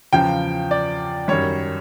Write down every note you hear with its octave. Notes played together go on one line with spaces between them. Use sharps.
E2 C#3 F3 G5
D5
F#2 D#3 G3 C#5